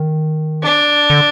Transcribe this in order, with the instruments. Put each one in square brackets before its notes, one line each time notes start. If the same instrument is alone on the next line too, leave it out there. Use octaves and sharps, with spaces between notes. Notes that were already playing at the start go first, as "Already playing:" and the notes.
Already playing: [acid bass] D#3
[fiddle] D4
[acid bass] D3